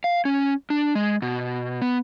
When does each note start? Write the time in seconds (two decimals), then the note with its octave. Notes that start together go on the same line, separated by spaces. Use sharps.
0.04 F5
0.25 C#4
0.70 D4
0.95 G#3
1.22 B2
1.81 B3